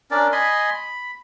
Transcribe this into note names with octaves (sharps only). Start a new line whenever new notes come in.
C#4 D4 A#4 D5
D#5 G#5 B5 C6
B5